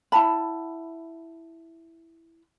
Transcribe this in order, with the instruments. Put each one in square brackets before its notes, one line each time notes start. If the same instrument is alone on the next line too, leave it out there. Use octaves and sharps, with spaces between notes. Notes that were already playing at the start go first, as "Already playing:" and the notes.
[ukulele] E4 F#5 A5 B5